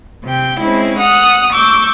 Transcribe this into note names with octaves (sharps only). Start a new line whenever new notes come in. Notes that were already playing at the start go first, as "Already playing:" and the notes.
C3 G5
G#3 C4 C#4 E4
F#5 D#6 F6
C#6 D6 E6 G6